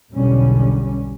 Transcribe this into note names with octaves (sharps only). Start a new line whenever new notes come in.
B1 E2 B2 D3 G3 C#4